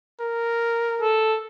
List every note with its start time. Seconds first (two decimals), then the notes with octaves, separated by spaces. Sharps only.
0.20 A#4
1.01 A4